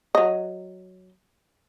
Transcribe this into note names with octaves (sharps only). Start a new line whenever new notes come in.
F#3 D#5